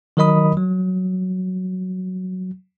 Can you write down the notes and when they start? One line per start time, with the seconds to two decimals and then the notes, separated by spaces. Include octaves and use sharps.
0.17 D#3 F#3 A#4 D#5 B5 D#6
0.57 F#3